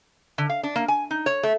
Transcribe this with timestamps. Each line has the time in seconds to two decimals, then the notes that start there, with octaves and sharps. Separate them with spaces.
0.38 D3
0.49 F5
0.63 D4
0.76 A#3
0.88 G#5
1.11 D#4
1.26 C#5
1.43 A3